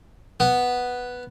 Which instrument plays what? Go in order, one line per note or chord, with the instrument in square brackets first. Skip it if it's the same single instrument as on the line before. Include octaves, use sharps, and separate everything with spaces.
[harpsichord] B3